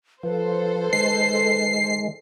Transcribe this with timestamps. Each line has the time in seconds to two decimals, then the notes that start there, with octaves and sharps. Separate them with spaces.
0.23 F3 A4 B4 C5
0.93 D#3 G#3 C7